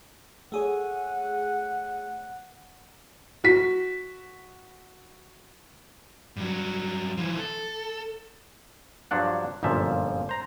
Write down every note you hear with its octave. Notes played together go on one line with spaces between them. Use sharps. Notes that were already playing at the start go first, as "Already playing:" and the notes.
A3 G#4 C#5 F#5
F#4 B6
G2 F#3
E3 F3
A4
G2 F3 F#3 D4 F#5
G1 F#2 A#2 F3 E5
C5 A#5